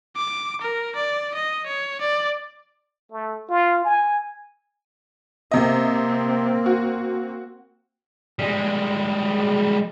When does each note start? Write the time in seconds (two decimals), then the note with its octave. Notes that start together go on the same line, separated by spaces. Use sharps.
0.16 D6
0.62 A#4
0.96 D5
1.35 D#5
1.67 C#5
2.01 D5
3.12 A3
3.49 F4
3.85 G#5
5.51 C3 A#3 C4 D#5
6.66 F#4
8.39 G3 G#3